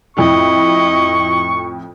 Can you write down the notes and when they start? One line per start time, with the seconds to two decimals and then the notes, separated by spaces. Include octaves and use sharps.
0.17 F2 A2 E4 D#5 C#6